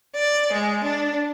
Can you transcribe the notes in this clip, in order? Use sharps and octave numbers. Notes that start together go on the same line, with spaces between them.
D5
G#3
D4